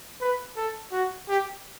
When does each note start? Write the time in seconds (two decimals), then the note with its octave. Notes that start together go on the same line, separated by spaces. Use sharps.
0.21 B4
0.56 A4
0.92 F#4
1.29 G4